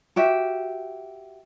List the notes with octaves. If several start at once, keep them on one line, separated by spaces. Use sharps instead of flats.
F#4 G4 E5